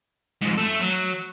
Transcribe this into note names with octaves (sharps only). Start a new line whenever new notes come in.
F2 G#2
A3 A4
F#3